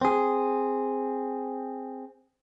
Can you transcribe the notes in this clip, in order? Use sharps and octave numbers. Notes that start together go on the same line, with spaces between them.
C4 G#4